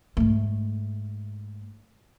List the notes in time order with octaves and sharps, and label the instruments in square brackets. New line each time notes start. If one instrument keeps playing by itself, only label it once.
[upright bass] G#2 A3